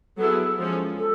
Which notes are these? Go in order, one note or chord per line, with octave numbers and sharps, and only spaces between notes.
F#3 B3 E4 G#4 A4
F3 G#3 C#4
A4